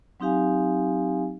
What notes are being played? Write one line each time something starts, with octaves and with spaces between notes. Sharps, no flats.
F#3 C4 D#4 G4 F5 G#5